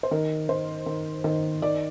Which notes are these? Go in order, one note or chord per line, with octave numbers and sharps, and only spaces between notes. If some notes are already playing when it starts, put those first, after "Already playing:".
C5
D#3 A#4
D#3 C5
D#3
D#3
D#3 D5